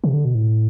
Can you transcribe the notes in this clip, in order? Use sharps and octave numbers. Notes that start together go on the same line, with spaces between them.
C3
D3
B2
A2